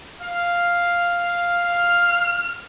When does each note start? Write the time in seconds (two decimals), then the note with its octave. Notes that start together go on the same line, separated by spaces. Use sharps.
0.22 F5
1.72 F6